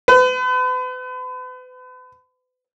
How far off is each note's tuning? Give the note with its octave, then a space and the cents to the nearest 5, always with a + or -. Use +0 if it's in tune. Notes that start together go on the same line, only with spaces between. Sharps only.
B4 +40